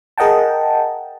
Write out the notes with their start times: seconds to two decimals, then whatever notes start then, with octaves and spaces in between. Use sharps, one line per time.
0.18 G#4 A#4 D#5 F#5 G5 A5